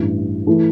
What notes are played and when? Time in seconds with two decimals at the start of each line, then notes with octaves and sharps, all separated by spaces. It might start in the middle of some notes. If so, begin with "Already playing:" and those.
Already playing: A1 G2 E3
0.46 E3 A3